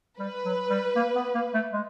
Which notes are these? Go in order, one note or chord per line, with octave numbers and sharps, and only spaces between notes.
G3 B4
F#3
G3
A#3
B3
A#3
A3
G#3